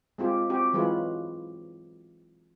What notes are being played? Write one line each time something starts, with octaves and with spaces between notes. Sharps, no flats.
G#3 C4 F4 G4
C4 F#4 G4
E3 F#3 G#3 E4 F4 B4